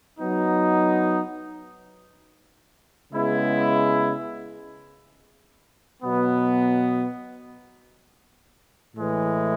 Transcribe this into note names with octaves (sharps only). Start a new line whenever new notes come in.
F#3 B3 D#4
C#3 G#3 B3 E4
B2 F#3 B3
A2 E3 G#3